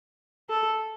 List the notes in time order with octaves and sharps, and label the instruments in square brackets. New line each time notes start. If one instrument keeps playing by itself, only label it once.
[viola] A4